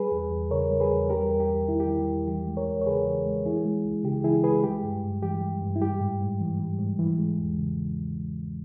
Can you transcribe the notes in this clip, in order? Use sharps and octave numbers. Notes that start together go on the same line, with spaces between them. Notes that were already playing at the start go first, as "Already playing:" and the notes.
Already playing: G3 G#4 B4
E2
E2
C#3 A#4 C#5
G3
G#4 B4
E2
G3 G4 A#4
E2
G4
E2
D#3 E4
G4
G3 E4
E2
E3 G4
G#3
A#4 C#5
D#2
C#5
C#3 G#4 B4
E3
G#3
E3 E4 G#4
G#3
C#2
C#3 G4
E3 E4 G#4
G#3 G#4 B4
G3 G4
G2
G2
E3 G4
G3
G2
E4
G3 G4
G#2
G#2
E3
G3
G#2
E3
G#3
E2
C#3